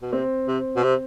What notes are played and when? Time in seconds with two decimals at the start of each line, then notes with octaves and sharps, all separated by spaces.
0.02 B2
0.13 C3 C4
0.48 C3
0.76 B2
0.84 C3